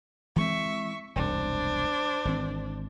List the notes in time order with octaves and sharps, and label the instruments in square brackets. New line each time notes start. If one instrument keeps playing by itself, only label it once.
[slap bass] E3 G#3 C4 [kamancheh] E5 C#6
[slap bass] E1 C2 F#2 [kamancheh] D4 C5
[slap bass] G#1 E3 C4